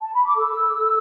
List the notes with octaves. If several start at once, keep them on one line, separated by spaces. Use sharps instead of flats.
A5
B5
D6
A4 E6
A4
A4